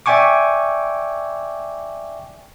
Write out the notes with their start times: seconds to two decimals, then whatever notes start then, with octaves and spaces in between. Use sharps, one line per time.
0.06 D5 E5 G5 G#5 C#6 D6